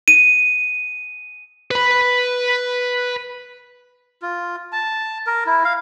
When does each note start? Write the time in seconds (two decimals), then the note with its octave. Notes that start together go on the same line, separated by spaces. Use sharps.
0.08 D#7
1.71 B4 B5
4.22 F4
4.72 A5
5.27 A#4
5.46 E4
5.64 F5